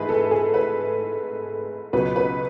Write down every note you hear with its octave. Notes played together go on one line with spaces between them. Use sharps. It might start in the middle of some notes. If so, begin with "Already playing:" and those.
Already playing: G#2 E3 A3 G#4 B4
A4
G#4
B4
C#2 B2 F#3 B4
B4